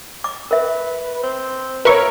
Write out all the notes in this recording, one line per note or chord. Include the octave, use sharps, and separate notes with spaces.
D6
A#4 B4 E5
C4
A#3 A#4 B4 C#5 E5 C#6